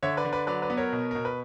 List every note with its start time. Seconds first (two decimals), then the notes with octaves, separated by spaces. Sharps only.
0.03 D3 C#5 E5
0.17 B4 D5
0.25 D3
0.33 B4 D5
0.47 F#3 B4 D5
0.62 B4 D5
0.70 B3
0.77 A#4 C#5
0.93 B2
1.11 B2 A#4
1.25 B4